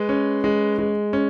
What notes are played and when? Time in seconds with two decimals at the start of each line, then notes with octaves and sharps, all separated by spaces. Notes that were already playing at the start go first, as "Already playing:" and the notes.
Already playing: G#3 B4
0.09 C#4
0.44 G#3
0.78 G#3
1.13 C#4